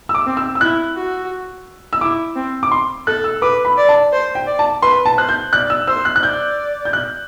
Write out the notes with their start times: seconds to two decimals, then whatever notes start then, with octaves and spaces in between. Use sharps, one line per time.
0.09 E6
0.15 D6
0.26 C4
0.37 E6
0.55 E6
0.61 E4 F#6
0.96 F#4
1.93 E6
2.01 E4 D6
2.36 C4
2.63 D6
2.71 C6
3.07 A4 F#6
3.24 E6
3.42 B4 D6
3.65 B5
3.77 D5
3.89 A5
4.13 C5
4.35 G5
4.47 D5
4.59 A5
4.82 B4 C6
5.06 A5
5.17 C5 F#6
5.29 G6
5.53 D5 F#6
5.70 E6
5.87 C5 E6
6.05 F#6
6.16 F#6
6.22 D5 G6
6.85 G6
6.93 F#6